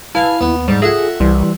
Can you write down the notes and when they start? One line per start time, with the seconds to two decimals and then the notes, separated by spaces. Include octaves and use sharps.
0.15 E4 B4 F5 G#5 A5
0.41 D#2 B3
0.68 G#2 G3
0.82 F4 G#4 A4 E5 F#5 A#6
1.20 C2 E3 G3 C6